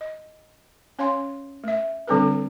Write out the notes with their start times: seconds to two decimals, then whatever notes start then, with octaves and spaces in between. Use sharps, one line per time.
0.01 D#5
0.99 C#4 C#5 F5 G#5 C6
1.64 A3 E5
2.08 D3 G3 C4 D4 A4 B4